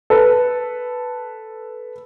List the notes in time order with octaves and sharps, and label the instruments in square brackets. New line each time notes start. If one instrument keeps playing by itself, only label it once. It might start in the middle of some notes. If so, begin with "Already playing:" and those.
[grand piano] A4 B4